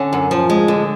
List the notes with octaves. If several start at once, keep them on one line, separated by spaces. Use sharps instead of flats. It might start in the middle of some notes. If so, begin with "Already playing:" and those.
Already playing: D3 C#4
F#2
F3
G#3
D3